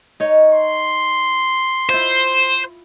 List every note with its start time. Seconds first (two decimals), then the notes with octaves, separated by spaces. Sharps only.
0.20 D#4 C#5
0.51 C6
1.89 E4 F4 C5